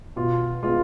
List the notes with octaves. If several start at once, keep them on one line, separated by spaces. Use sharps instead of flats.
B2 F4
G#3 B3 F4